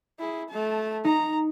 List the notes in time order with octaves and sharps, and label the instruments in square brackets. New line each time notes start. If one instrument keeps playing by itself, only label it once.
[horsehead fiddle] E4 G#4
A3 A5
[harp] D#4 [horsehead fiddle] A#5